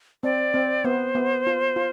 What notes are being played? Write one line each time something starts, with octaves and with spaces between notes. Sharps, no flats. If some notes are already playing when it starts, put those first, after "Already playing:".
C4 D5
C4
B3 C5
B3
F4
F4